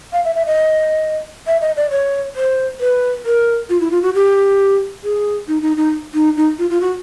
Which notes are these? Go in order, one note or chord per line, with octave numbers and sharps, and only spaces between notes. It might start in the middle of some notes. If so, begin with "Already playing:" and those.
F5
E5
E5
D#5
E5
D#5
D5
C#5
C5
B4
A#4
F4
E4
F4
F#4
G4
G#4
D#4
D#4
D#4
D#4
D#4
F4
F4
F#4